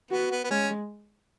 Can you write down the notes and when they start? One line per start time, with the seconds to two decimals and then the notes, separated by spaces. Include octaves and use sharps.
0.11 B3 F#4
0.31 B3
0.44 B3
0.50 G#3 C#4